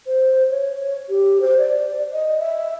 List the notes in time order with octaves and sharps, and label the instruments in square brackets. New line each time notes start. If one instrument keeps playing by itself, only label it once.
[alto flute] C5
C#5
G4
C5
D5
D#5
E5